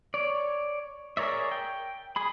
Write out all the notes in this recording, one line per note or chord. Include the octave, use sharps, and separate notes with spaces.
C#5 D5
G#4 A#4 C#5 D5 E5
G5
G#4 B5